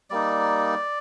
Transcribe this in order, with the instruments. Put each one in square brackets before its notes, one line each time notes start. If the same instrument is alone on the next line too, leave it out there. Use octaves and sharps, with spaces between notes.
[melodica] G3 A#3 D#4 D5